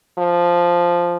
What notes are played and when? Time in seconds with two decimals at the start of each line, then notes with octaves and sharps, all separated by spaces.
0.19 F3